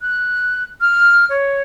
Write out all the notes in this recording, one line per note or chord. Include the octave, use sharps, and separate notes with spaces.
F#6
F6
C#5